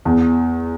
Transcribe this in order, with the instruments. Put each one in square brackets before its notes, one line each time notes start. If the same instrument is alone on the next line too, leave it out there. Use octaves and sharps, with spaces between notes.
[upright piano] E2